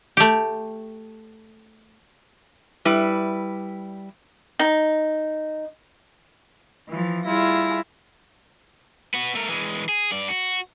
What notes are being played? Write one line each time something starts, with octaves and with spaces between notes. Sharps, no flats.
A3 G4
G3 E4 B4
D#4
E3 F3
G3 E4 F4 G#4 A#6
B3 F#4
A3 A#4
E3 G#3
G#4
G2 D5
F#4